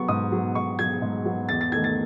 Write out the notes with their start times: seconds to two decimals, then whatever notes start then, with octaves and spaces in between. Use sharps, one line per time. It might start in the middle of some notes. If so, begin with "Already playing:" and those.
Already playing: F#3 B3 C#6
0.08 G#2 D#6
0.32 F#3 B3
0.55 G#2 C#6
0.79 F#3 B3 G#6
1.02 G#2
1.25 F#3 B3
1.49 E2 A6
1.61 A6
1.72 D#3 A3 G#6
1.84 A6